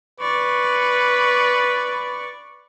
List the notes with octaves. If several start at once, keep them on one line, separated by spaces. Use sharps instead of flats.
B4 D5 C#6